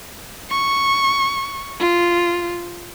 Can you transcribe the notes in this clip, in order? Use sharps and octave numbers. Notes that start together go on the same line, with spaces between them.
C#6
F4